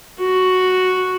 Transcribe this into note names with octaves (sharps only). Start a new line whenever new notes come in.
F#4